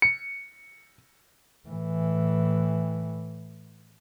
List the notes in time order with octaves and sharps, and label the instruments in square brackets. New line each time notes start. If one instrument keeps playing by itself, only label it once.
[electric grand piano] C#7
[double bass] A2 E3